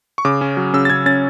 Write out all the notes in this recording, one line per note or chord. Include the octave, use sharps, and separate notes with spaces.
C#6
C#3 D6
C#4
F#3
C#3 E6
A6
C#3 G#6
C#4 A6